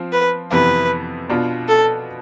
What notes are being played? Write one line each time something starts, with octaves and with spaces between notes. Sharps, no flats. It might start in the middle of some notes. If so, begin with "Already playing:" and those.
Already playing: F3 C4 F4
B4
F2 C3 E3 B3 B4
B2 B3 D4 F4
A4